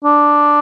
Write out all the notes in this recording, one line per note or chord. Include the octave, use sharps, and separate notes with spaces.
D4